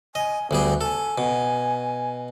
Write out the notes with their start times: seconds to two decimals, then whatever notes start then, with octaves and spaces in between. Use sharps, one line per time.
0.15 D#5 G#5
0.51 D2 G3 B3 G#4
0.81 A4 G#5
1.18 B2